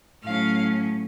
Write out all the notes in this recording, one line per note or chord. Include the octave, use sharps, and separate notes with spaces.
A2 F#3 C#4 F5